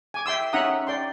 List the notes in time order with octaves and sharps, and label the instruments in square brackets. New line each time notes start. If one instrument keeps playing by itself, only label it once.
[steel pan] G#5 D6
E5 G5 C6 E6
C#4 D#4 E5 F#5 A#5 D#6
D5 G5 C6